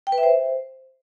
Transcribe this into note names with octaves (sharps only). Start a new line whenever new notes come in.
G5
B4
E5
C5